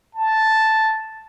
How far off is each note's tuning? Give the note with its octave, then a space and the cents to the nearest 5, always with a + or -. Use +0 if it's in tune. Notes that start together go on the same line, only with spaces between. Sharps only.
A5 +0